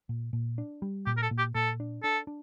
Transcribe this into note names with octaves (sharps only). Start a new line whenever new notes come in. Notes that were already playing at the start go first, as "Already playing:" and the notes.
A#2
A#2
D4
G3
A#2 G4
A#4
A4
A#2
G4
A#2 A4
D4
D4 A4
D4